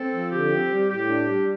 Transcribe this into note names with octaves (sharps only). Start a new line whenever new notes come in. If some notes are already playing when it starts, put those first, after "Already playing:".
Already playing: C4 A4
F3
D3 G4
C4
G3
A2 G4
D4
G3